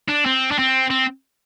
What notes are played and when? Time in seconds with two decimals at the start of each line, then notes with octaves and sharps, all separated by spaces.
0.09 D4
0.26 C4
0.51 D4
0.59 C4
0.90 C4